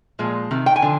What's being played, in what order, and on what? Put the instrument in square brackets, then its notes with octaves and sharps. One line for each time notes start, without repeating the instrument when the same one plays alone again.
[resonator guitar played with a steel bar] A#2 F3 G#3
C3 D#3
G5
G#5
D3 F3